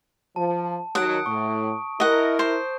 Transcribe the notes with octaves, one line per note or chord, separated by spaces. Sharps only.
F3 A5
D#3 F#3 F#5 D#6 D7
A2 C#6
E4 A#4 D#5 F#5
C5